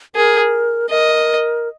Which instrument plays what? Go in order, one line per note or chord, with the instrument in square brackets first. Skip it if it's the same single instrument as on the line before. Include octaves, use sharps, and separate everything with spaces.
[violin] G#4 [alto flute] A#4
[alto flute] A#4 [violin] D#5